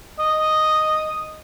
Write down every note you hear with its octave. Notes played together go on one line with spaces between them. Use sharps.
D#5